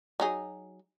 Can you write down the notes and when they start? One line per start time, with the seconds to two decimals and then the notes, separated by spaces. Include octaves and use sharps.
0.20 F#3 D#4 G#4